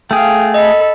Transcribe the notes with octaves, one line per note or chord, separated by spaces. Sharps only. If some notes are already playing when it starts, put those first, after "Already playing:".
A3 G#4 F5 G5
A4 D#5 B5